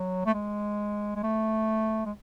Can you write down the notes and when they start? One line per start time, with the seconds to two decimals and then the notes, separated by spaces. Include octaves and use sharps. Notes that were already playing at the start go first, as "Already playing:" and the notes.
Already playing: F#3
0.26 A3
0.34 G#3
1.16 G#3
1.23 A3
2.05 G#3